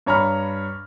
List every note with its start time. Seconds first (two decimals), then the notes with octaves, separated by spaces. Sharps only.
0.06 G2 C#5 A#5 B5 F6